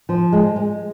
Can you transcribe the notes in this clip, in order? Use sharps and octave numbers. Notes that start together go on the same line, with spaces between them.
F3
G#3
G#3